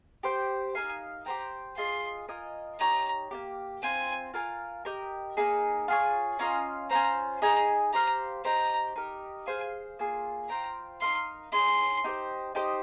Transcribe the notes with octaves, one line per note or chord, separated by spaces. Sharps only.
G4 C5 G5
D#4 A#4 F5 G#5
G4 C5 G5 A#5
F4 G#4 D#5 C6
F4 A#4 D#5 G#5
D#4 G4 C#5 A#5
A#3 D#4 G4
C4 F4 C5 G#5
F4 A#4 F5 G#5
G4 A#4 D#5
A#3 D#4 G#4
F4 G#4 C#5
C#4 F4 C5 D#5 A#5
C#4 F4 C5 A#5
D#4 G#4 D#5 G#5 A#5
G4 C5 F5 A#5
D#4 G4 C5 A#5
D#4 G4 A#4
G#4 C5 F5 G#5
A#3 F4 G#4
F4 C5 G5 A#5
D#4 A#4 F5 C6
D#4 G#4 C#5 C6
D#4 G4 C5
D#4 G4 C5 D#5